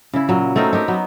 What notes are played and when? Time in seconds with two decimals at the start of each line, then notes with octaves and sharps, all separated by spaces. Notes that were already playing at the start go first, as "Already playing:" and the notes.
0.13 C#3 E4
0.29 A#2 F#3
0.56 A3 C4 D#4 A#4
0.73 D#4 G4 A#4
0.88 F#3 B3